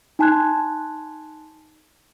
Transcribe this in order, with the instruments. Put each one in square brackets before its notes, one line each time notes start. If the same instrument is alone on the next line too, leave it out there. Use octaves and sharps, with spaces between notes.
[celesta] D#4 G#5 A5 C6 F#6 G#6